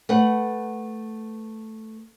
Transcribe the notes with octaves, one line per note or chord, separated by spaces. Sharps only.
A3 B4 F#5